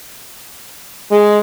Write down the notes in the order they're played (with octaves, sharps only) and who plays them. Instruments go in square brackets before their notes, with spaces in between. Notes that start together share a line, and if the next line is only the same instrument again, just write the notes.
[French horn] G#3